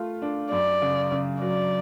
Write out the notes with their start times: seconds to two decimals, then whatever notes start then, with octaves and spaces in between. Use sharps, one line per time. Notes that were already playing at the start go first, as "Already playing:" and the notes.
Already playing: A3 F4
0.22 D4
0.51 F#2 D5
0.82 C#3
1.12 C#3
1.41 F#3 D5